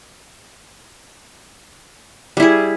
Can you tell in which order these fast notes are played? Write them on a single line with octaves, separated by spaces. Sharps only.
G3 E4 G#4